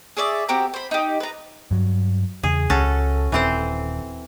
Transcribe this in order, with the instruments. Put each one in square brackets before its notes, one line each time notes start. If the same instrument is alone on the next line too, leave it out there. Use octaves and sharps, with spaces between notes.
[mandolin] G#4 C#5 D5 E5
C4 F#4 G4 A#5
C5 B5
D#4 G4
B4 A#5
[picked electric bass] G2 F#3
[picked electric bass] E2 C#3 [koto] G#4
[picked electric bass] C#2 [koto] C#4 F#4 A4
[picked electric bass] D#1 [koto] E3 C4 C5